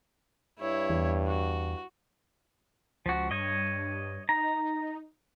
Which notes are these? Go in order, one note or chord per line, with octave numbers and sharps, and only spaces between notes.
G2 E4 C#5
E2
F#4
C#2 F3 F#4
G2 C#5 D#5
D#4 A#5